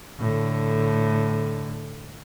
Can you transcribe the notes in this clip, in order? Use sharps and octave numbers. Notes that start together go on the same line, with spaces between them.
A2 D3